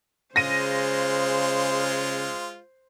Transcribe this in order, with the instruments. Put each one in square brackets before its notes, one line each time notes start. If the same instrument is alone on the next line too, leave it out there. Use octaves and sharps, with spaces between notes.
[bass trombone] C#3 [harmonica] G#3 F4 [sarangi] C5 [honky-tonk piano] A#6 D#7